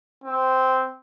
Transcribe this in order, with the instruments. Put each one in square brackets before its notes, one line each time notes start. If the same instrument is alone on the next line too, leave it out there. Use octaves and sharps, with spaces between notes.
[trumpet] C4